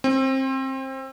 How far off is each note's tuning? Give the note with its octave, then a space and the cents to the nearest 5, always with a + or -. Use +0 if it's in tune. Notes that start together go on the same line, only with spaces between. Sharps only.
C4 +25